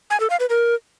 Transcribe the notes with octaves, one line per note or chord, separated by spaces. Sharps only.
G#5
A4
F5
B4
A#4